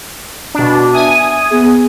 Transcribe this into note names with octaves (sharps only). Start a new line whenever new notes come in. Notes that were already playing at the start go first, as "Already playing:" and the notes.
B2 D4
E5 G#5 D#6
B3 G#4